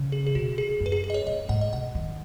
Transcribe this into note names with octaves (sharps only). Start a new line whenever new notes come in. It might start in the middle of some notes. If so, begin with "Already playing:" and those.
Already playing: C#3
G#4
G#4
B2 F#4
G#4
F#2
B4
G#4
G#4
D#5
C#5
F#2 D#5
G#2 F#5
D#5
B2 F#5
D#3